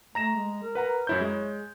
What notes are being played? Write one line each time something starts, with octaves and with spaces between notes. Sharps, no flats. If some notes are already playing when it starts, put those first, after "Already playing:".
A3 A#5 A#6 E7
G#3
A#4
B4 F#5 A#5
F#2 E4 C#5 G6
G#3